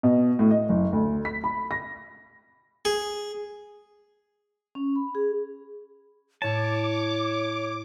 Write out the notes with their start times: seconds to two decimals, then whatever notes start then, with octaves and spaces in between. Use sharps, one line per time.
0.03 B2
0.39 A2
0.51 D#5
0.69 F#1
0.93 D2
1.25 B6
1.44 B5
1.71 A#6
2.85 G#4
4.75 C#4
4.96 B5
5.15 G#4
6.42 A2 C#5 A5 D6 E7